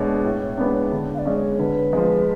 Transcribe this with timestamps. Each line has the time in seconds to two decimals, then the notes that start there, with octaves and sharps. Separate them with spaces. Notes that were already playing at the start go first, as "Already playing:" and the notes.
Already playing: B2 G#3 D4 C#5
0.24 A2
0.58 G#3 B3 D4
0.92 D3
1.15 F5
1.19 D5
1.25 G#3 C#4
1.36 C#5
1.59 D3 B4
1.93 F3 G#3